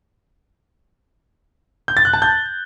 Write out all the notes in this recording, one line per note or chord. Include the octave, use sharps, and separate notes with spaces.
G6
A6
F#6
A5
G6